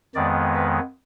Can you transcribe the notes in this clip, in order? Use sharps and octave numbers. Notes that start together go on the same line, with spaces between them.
F2 D#3 G#3 B3 D5
B4